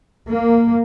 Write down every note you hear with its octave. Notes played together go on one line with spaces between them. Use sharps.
A#3